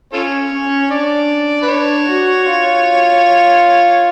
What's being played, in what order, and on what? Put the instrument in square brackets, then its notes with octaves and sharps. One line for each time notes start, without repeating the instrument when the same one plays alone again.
[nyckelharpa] C#4 [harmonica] F4 A4 C#5
[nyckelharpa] C#4
[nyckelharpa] D4 [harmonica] D5
[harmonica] B4
[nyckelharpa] D4 [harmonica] C#5
[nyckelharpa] F#4
F4